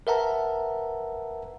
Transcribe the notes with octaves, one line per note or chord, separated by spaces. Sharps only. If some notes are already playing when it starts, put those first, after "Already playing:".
A#4 B4 E5 F#5 A5 A#5